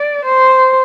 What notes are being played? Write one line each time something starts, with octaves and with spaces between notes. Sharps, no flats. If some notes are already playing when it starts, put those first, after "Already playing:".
Already playing: D5
C5